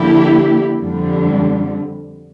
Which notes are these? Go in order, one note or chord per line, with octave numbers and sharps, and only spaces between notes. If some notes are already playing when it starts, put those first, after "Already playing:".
Already playing: D3 F3 A#3 E4 G4
F2 D3 G3